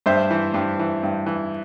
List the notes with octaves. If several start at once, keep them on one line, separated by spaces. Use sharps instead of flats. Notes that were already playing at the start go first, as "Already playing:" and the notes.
G2 C5 E5
E3
G2
E3
G2
E3